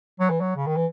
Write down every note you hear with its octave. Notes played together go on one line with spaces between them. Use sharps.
F#3
E3
F#3
C#3
D#3
E3